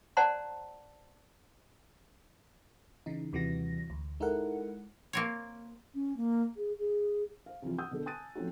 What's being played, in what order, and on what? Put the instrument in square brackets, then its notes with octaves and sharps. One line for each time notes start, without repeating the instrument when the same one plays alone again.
[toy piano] C5 D5 F#5 A5 A#5 C6
[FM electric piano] C#3 E3 D#4
D#2 C3 E3 G3 F#4 A#6
D2
G#3 D#4 E4 A4 A#4 F#5
[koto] A#3 C4 C#5
[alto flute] C#4
A#3
G#4
G#4
[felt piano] C5 F5
C3 E3 F3 G3 F4
F#5 D#6 E6 G6
B2 D3 A4
G#5 A5 D#6 F#6 A6 D#7
F3 A3 C4 C#4 D#4 F#4